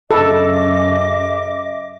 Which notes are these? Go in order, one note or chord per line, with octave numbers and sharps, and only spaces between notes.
F#2 C#3 A4 D#5 E5 D6